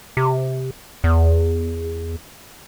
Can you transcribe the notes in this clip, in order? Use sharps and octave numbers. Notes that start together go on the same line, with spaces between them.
C3
E2